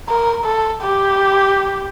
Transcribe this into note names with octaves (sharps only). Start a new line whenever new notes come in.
A#4
A4
G4